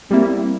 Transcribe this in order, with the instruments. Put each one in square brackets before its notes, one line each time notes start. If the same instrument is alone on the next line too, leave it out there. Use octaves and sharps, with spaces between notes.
[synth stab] G3 A#3 E4 [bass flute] C4